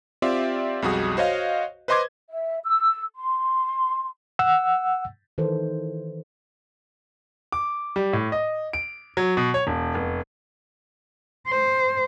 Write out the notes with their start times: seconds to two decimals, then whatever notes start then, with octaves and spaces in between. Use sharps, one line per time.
0.22 C4 F4 G4 D5 E5
0.82 B1 F2 G3 F#4 G#4 D#6
1.17 F#4 C5 C#5 D#5 F5
1.88 B4 C5 D#5 C6 D6 G#6
2.29 E5
2.64 E6
3.16 C6
4.39 F#5 E6
5.38 D#3 E3 A4 C5
7.52 D6
7.96 G3
8.13 A2
8.32 D#5
8.73 D7
9.17 F#3
9.37 B2
9.54 C#5
9.67 E1
9.95 F1
11.48 C5